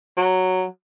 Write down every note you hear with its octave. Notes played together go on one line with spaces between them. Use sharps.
F#3